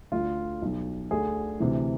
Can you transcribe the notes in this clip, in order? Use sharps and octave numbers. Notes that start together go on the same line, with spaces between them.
D2 D3 F4
B1 B2
D2 D3 G#4
D2 C3 E3